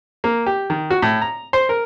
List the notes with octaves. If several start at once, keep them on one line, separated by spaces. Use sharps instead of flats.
A#3
G4
D#3
F#4
A2
A#5
C5
A#4